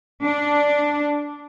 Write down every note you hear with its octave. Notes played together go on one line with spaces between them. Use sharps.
D4